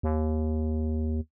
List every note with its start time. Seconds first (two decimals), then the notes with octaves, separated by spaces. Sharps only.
0.03 D#2